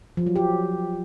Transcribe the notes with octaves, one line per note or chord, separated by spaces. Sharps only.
F3
F#3
G4